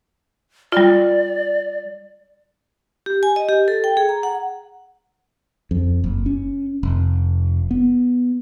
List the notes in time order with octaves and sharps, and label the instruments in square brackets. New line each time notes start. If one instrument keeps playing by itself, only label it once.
[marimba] G3 F4 [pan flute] D5
[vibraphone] G4
G#5
D#5
G4
A4
G5
G#4
A#5
F#5
[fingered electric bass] F2
F#1
C#4
F1
B3